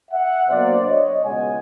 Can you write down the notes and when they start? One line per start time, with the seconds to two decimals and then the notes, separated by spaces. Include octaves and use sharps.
0.11 E5 F#5
0.49 B2 F#3 A#3 D4 C5 D5
0.87 C#5 D#5
1.24 C#2 B2 G#3 F#5 G#5